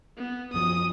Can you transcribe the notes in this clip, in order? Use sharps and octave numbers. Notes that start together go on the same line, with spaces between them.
B3
F#2 F3 F#3 D#6